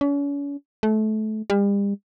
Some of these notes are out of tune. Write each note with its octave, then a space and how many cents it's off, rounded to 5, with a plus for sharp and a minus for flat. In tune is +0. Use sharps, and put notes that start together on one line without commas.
C#4 +40
A3 -25
G3 +40